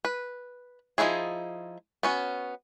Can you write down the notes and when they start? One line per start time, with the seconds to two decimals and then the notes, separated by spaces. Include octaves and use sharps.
0.05 B4
0.98 F3 A#3 D#4 E4 G#4
2.03 B3 C#4 F#4